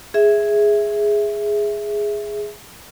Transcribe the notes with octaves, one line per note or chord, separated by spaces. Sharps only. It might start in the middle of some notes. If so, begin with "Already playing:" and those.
G#4 E5